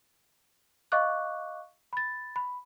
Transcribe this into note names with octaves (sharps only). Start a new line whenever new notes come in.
D#5 F5 C#6 D6 F#6
B5 A6
B5